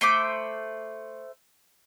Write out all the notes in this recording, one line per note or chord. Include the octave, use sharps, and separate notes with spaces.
A3 C5 B5 D6